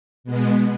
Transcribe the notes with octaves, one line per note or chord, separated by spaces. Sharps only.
B2 G#3 B3